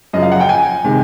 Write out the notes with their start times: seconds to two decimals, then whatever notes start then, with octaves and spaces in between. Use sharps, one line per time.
0.13 F#2 C#3 F3 D#5
0.22 F5
0.32 F#5
0.40 G5
0.49 G#5
0.84 C3 D#3 G#3